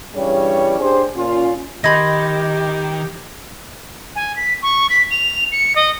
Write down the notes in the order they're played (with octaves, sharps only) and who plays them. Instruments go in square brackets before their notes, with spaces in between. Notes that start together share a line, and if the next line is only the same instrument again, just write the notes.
[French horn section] G2 E3 G3 C#4 G#4 C#5
D4 G4 G#4 C5
A#2 C#4 F4
[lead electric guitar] D#3 [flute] G4 [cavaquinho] D#5 B5 C6 [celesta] G#6 A#6
[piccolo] G#5
B6
C#6
B6
F7
C#7
D#5